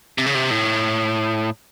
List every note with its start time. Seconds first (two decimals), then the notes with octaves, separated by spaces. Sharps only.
0.18 C3
0.26 C#3
0.35 C3
0.51 A2